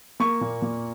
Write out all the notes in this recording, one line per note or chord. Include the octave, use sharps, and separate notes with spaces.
A#3 C#6
A#2
A#2